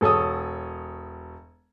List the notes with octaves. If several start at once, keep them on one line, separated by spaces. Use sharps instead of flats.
E1 A4 C#5 D#6